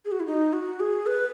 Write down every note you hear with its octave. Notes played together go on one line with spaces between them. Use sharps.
G#4
F#4
E4
D#4
F#4
G#4
B4